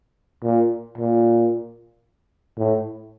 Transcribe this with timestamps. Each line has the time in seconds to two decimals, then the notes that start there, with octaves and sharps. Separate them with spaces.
0.43 A#2
0.98 A#2
2.58 A2